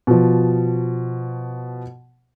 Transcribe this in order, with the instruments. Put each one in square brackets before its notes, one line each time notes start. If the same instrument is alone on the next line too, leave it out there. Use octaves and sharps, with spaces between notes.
[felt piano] B2 F3